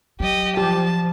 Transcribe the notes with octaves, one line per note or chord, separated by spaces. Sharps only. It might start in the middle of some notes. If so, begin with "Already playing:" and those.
F#3 G4 D#5
F3 G4 A5